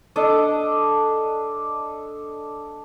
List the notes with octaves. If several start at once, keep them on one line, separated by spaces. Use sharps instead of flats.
D4 A4 D5 D#5